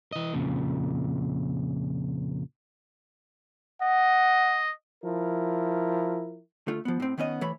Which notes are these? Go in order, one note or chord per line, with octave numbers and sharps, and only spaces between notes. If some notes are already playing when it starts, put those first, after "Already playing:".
E3 D#5
F2 A#2 C#3
D#5 F#5
F3 E4 A#4
D3 A3 F4
F3 B3
A2 C4
D#3 B3 C#4 D#5
E3 A3 C#5 B5